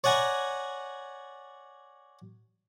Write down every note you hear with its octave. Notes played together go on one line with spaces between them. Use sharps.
C#5 D5 F#5 G#5 A#5